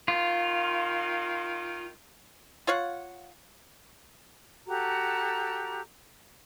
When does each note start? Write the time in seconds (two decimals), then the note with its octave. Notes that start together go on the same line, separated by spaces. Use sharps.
0.08 D#3 F4
2.67 F4 C#5 F5 F#5
4.66 F#4 G4 A4 A#5